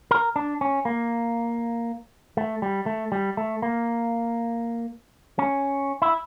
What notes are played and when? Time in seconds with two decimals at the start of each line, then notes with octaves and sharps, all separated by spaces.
0.11 A#4
0.36 D4
0.61 C#4
0.85 A#3
2.37 A3
2.62 G3
2.86 A3
3.12 G3
3.37 A3
3.62 A#3
5.39 C#4
6.02 E4